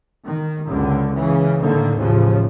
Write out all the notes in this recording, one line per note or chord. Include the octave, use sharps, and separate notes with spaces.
D#3
C#2 F#2 D3
C#3 E3
A2 D3 D#3 A#3
A1 D#2 A2 C#3 F3